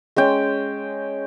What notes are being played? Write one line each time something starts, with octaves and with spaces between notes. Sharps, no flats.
G#3 C#4 G5